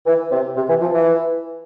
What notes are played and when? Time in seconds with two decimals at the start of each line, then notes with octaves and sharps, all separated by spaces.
0.06 E3
0.32 C3
0.56 C3
0.69 E3
0.82 F3
0.94 E3